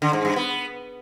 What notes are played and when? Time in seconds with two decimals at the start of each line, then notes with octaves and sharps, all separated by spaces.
0.02 D3
0.13 G#2
0.25 G2
0.36 B3